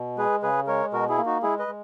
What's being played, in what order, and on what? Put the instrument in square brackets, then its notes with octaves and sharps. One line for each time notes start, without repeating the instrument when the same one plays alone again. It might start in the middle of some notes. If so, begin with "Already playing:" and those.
Already playing: [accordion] B2
G#3 G#4 B4
C#3 G#4 B4
G#3 A#4 C#5
B2 F#4 A#4
E4 G#4
A#3
D#4 F#4
G#3 E4 G#4
B4 D#5
G#3